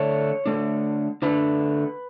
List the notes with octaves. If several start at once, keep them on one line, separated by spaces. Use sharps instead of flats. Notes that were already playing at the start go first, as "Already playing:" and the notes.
Already playing: D3 A3 D4 C#5
D3 A3 D4
D3 A3 D4 B4